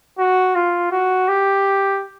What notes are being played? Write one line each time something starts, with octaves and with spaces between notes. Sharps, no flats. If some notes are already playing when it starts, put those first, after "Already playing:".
F#4
F4
F#4
G4